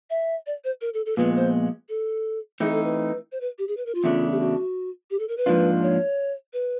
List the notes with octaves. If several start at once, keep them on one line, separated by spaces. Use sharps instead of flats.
E5
D5
C5
A#4
A4
A4
A#2 F3 G#3 B3 B4
C5
A4
E3 A3 C4 D#4 G#4
A4
B4
C5
B4
G4
G#4
B4
A#4
F4
E2 C#3 A3 D4
G4
F#4
G4
A4
A#4
B4
G#2 F3 A#3 D4 F4
C#5
B4